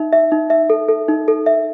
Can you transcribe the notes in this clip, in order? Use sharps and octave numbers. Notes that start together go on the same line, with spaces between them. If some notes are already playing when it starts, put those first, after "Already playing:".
Already playing: D#4 E5
E5
D#4
E5
A4
A4
D#4
A4
E5